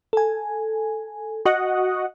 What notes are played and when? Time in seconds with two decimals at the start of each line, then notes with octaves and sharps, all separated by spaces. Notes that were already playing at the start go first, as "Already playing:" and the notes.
0.13 A4 G#5
1.45 F#4 D#5 F#5